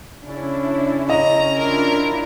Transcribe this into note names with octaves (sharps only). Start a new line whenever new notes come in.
C#3 C#4 D4 E4
D#5 A#5
D4 E4 F4 A#4